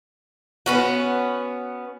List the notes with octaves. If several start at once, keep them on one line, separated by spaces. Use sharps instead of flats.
B3 C#4 F#4